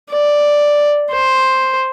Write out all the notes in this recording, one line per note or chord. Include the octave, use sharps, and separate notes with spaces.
D5
C5